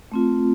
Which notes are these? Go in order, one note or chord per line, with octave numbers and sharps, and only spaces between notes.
A3 C4 F4